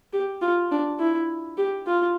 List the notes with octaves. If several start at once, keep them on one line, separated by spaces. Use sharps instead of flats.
G4
F4
D4
E4
G4
F4